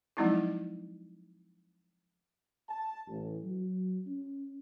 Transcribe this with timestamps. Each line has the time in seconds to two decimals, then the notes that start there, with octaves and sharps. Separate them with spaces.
0.17 F3 F#3 G#3 C4 D#4 E4
2.69 A5
3.07 A1
3.44 F#3
4.07 C#4